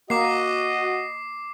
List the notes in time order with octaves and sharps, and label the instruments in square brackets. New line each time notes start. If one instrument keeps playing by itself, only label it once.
[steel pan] A#3 [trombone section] F#4 [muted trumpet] D#5 [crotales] D6 C7